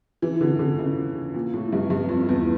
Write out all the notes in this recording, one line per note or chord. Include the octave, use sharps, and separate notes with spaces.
E3
D3
D3
C#3
A#2
A2
G2
G2
F2
E2